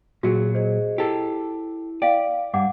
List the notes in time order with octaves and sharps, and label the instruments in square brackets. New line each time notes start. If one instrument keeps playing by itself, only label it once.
[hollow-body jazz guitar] A#2 F#3 [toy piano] F#4 [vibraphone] G#4
[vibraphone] G#4 D#5 [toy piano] C5
[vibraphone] E4 [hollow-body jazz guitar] G4 A4
[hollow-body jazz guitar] D5 [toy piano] F5 G5
[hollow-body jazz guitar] G2 [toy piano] F#5 D6